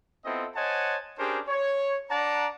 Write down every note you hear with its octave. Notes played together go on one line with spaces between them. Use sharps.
B3 C4 E4 F4 A4 D#5
C5 C#5 D#5 F#5 G#5 A5
C#4 D4 G4 G#4 A#4 C5
C#5
D4 D5 F#5 A5 A#5